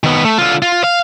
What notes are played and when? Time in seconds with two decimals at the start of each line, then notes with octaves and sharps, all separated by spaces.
0.04 D#3 B3
0.25 A3
0.38 D3 F4
0.62 F4
0.84 F5